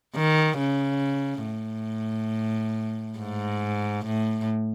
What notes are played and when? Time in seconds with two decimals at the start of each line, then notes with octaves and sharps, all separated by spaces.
0.15 D#3
0.59 C#3
1.46 A2
3.19 G#2
4.05 A2